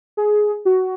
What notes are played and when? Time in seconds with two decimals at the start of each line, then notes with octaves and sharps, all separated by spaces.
0.17 G#4
0.65 F#4